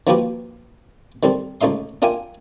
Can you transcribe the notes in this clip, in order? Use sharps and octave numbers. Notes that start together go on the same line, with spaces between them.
D#3 F3 A#3 F#4 G4 B4
D#3 G3 C4 A4
C#2 A3 D#4 E5 C6
D4 F4 A#4 E5 G5 G#5